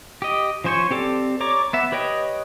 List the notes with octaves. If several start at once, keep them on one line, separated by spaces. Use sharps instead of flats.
G4 D#5
F3 C#4 C5 G#5 C#6
C4 G4 A4 D5
C#5 D5 A#5 D6
B3 E5
G4 B4 C#5 D#5 G5